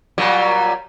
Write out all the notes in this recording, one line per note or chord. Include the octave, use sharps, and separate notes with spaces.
A#2 F#3 G3